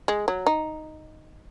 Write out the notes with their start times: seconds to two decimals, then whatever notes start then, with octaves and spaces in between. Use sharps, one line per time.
0.08 G#3
0.28 F#3
0.46 D#4